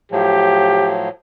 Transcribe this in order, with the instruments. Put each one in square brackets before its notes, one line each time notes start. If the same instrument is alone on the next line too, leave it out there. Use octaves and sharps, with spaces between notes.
[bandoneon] A2 F3 F#3 [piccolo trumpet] G4